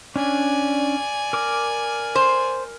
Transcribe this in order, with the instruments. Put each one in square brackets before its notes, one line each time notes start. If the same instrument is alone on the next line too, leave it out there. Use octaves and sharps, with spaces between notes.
[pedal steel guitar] C#4 D4 [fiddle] D5 G#5
[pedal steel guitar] A#4 D6
[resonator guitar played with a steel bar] C5